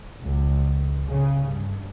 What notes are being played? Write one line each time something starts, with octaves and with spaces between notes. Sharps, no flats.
C#2
C#3
G2